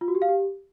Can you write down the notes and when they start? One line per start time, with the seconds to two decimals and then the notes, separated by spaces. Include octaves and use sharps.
0.01 F4
0.08 F#4
0.15 G4
0.22 F5
0.29 G4